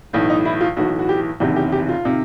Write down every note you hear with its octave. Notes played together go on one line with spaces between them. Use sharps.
B1 A2 E3
D#4
E4
F4
B1 A2 E3 F#4
F#4
G4
F#1 E2 C3 D#3 G4
G4
G4
F4
C3 D#3